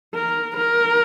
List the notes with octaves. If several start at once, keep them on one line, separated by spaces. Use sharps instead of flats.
A#4
A#4